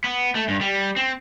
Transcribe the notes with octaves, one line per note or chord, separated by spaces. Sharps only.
B3
A3
G2
G3
C4